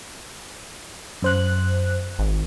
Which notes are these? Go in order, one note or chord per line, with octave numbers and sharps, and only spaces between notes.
F#2 C5 F#6
G#1